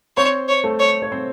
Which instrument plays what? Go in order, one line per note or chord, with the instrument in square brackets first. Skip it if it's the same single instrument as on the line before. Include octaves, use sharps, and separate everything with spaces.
[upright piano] C4 C5 [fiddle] C#5
[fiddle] C#5
[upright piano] A3 A4
[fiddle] C#5
[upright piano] C#5
C4 C5